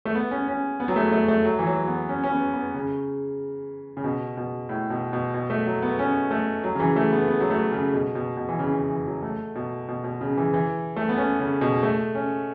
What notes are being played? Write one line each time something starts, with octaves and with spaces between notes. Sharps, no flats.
A3
B3
C#4
C#4
B3
F#3
A3
A3
A3
F#3
E3
F#3
B3
C#4
C#4
B3
B3
C#3
C#3
B2
B2
A2
B2
B2
B2
A3
F#3
B3
C#4
A3
F#3
C#3
E3
A3
B3
B3
F#3
A3
C#3
B2
B2
B2
E3
C#3
C#3
E3
F#3
A3
B2
B2
B2
C#3
E3
E3
A3
B3
C#4
C#3
B2
A3
C#4